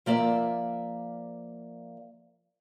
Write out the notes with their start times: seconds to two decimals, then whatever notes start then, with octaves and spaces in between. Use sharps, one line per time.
0.06 F3 A#3 D5 E5